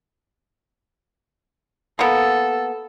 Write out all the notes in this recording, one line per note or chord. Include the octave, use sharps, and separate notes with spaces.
A#3 B3 A4